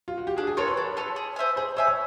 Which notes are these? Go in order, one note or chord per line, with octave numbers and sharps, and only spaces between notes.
F4
F#4
G4
D4 G#4
G#4
F4 A4 A#4 C#5
B4
D4
F4 A4 C#5
G#4
C5 E5 G#5
G#4 C5
C5 C#5 E5 G#5
C#5